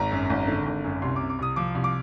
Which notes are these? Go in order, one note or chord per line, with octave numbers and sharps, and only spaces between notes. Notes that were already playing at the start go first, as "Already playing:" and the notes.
Already playing: G#1 A#5
F#2
G#1
D3
G#1
F#2
C2 C6
C3 D6
D6
C2 D#6
F3 D6
C2
D6